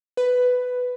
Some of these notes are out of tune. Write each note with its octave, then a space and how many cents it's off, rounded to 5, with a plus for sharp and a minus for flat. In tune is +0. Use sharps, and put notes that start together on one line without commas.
B4 +10